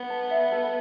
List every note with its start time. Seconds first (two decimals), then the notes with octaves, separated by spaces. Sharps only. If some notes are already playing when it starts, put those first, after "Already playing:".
Already playing: B3
0.10 A5
0.31 E5
0.52 A4